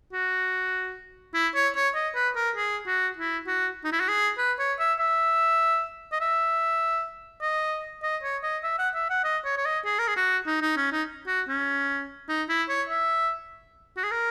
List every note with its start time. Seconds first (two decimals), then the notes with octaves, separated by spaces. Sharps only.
0.13 F#4
1.34 E4
1.55 C#5
1.75 C#5
1.95 D#5
2.15 B4
2.36 A#4
2.56 G#4
2.87 F#4
3.17 E4
3.47 F#4
3.84 D#4
3.92 E4
4.00 F#4
4.09 G#4
4.38 B4
4.59 C#5
4.79 E5
4.99 E5
6.12 D#5
6.21 E5
7.42 D#5
8.03 D#5
8.23 C#5
8.43 D#5
8.63 E5
8.79 F#5
8.95 E5
9.10 F#5
9.24 D#5
9.45 C#5
9.57 C#5
9.65 D#5
9.85 G#4
9.99 A#4
10.08 G#4
10.16 F#4
10.47 D#4
10.62 D#4
10.77 C#4
10.92 D#4
11.27 F#4
11.48 C#4
12.29 D#4
12.49 E4
12.69 C#5
12.89 E5
13.97 F#4
14.04 G#4
14.11 A#4